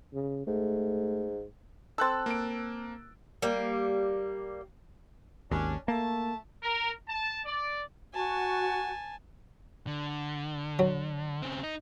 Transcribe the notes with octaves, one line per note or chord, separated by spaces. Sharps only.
C#3
G#2 A3
C4 A4 E6 F#6 A6
A#3 D7
G3 A#3
G#1 D#2 C#4 D4
A3 A#3 A5
A#4
A5
D5
F#4 G#5 A5
D3
F#3
C#3 C4
D#4